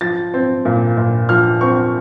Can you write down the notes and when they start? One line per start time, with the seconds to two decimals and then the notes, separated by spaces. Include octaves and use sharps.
0.01 F3 A6
0.34 C4
0.65 A#2
0.97 A#2
1.29 F3 F6
1.61 C4 C#6